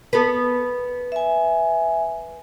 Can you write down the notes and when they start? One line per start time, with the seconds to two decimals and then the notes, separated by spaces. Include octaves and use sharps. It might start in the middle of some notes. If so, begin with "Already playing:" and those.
0.13 B3 A4
1.12 E5 G#5